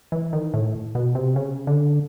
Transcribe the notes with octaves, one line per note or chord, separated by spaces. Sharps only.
E3
D#3
A2
B2
C3
C#3
D3